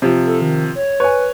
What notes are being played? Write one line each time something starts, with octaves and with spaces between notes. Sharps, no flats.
C3 F3
A4
D#3
C#5
B4 C#5 G#5